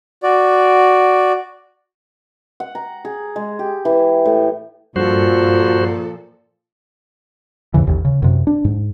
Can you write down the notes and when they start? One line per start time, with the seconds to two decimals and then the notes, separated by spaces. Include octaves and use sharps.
0.23 F#4 D5
2.60 F#5
2.75 A#5
3.05 G#4
3.36 G#3
3.59 G4
3.85 E3
4.26 A2
4.96 G2 A#2 F3 F#4 A4 C5
7.74 D#2 G#2 C#3 E3
7.87 A1 D#2
8.05 C#3
8.22 F#2 C3
8.47 D4
8.65 G#2